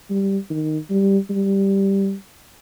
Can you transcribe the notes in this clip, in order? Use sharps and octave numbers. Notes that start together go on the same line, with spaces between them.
G3
D#3
G3
G3